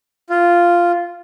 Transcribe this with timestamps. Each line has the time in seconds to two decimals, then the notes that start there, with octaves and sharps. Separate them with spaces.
0.30 F4